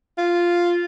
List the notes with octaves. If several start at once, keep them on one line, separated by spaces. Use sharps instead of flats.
F4